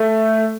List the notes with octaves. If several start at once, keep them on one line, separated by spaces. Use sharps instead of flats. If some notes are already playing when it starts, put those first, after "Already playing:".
Already playing: A3